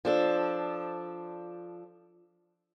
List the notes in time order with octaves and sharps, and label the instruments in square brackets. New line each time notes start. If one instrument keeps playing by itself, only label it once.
[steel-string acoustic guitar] F3 D4 A4